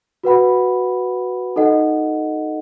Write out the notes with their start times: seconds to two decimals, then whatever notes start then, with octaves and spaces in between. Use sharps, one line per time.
0.24 F#4 B4 F#5 B5
1.56 D#4 A4 D#5 F#5